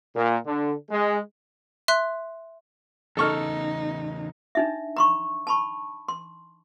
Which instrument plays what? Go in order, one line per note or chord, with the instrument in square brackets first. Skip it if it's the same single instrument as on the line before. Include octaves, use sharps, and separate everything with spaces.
[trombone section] A#2
D3
G#3
[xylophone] E5 C6 F#6
[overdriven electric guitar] E2 C#3 [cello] D#4 [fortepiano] A4 C#6 F6
[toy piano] D4 D#4 E5
A#5 C6 C#6
A5 B5 C#6
C6